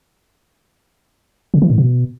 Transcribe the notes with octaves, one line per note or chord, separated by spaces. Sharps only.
C#3
E3
A2
B2